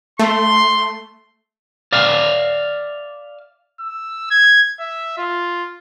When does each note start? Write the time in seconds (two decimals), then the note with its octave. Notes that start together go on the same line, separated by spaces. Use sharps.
0.19 A3 C6
1.93 D5 E5 F5
3.80 E6
4.31 G#6
4.80 E5
5.18 F4